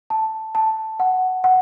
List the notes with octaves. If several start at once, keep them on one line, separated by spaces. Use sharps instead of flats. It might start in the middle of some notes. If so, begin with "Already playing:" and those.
A5
A5
F#5
F#5